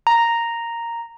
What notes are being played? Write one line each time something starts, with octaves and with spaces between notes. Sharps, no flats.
A#5